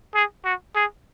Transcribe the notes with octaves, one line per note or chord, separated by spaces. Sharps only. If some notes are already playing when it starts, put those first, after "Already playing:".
G#4
F#4
G#4